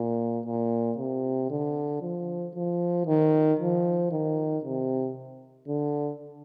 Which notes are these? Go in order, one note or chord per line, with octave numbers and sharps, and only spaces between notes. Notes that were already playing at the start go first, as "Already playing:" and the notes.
Already playing: A#2
A#2
C3
D3
F3
F3
D#3
F3
D#3
C3
D3